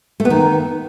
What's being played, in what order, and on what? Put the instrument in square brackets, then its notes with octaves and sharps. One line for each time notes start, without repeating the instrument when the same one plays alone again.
[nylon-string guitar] A3
B3
D#3